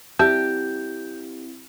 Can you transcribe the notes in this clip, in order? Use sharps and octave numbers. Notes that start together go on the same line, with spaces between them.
G3 C4 E4 G4 E5 A5 G6